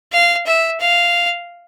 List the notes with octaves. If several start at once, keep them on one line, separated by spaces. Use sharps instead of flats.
F5
E5
F5